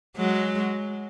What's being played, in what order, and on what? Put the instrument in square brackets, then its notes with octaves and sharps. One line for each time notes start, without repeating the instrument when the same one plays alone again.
[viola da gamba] F#3 G#3